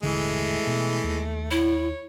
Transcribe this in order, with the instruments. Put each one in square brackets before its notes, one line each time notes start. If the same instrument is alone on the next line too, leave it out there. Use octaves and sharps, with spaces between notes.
[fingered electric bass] D#1 G#1 D3 [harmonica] E3 G#3 [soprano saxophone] A3
[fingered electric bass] B2
D#2
[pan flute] E4 [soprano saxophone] C#5